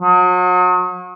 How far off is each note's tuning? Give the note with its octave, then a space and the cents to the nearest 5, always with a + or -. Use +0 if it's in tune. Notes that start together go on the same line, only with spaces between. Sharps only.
F#3 -40